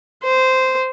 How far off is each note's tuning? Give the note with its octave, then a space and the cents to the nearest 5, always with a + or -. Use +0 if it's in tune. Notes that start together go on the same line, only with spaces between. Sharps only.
C5 -10